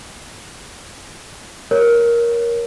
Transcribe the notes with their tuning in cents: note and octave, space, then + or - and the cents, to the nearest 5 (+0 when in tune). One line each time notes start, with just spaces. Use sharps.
A#4 +15 C#5 +0